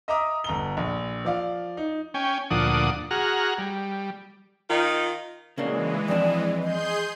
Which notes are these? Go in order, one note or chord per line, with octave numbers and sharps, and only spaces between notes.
D#5 E5 A#5 D6 D#6
G1 A#5 G7
A#1
F3 D5 F5
D#4
C#4 G5 G#5
D2 A#2 F3 D4 F#5 D#6
F#4 G#4 F#5 A#5 F6
G3
D#3 D#4 F4
C#3 E3 G#3 A#3 D4
F2 D4 D5
G#4 D#5 C6 G6